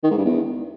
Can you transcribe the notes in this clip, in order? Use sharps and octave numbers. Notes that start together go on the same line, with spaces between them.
D#3
G#2
G2
E2